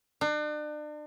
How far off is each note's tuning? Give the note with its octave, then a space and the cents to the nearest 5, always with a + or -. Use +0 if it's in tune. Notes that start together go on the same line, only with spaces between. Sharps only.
D4 +40